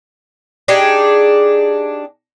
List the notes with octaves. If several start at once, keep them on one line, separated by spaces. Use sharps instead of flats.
D4 D#4 G4 G#4